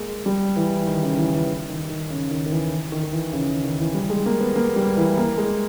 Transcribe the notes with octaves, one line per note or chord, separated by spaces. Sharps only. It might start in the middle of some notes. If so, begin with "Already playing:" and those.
Already playing: G#3 A#3
G3
E3
D#3
C#3
E3
E3
D#3
D#3
C#3
D#3
D#3
E3
D#3
D#3
E3
C#3
D#3
D#3
E3
G3
G#3
A#3
B3
A#3
G3
E3
A#3
G#3